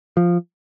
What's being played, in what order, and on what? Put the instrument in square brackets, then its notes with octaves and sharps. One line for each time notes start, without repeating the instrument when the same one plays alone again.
[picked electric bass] F3